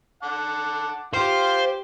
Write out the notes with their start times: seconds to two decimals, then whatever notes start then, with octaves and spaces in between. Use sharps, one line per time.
0.23 F#5 A5 D6
1.14 F4 G4 C5 F5